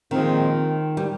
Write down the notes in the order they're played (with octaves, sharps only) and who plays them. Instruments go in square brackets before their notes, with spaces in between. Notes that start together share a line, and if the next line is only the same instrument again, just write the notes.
[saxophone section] A#2 F3 G#3 C4 [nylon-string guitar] D#3
[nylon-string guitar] G3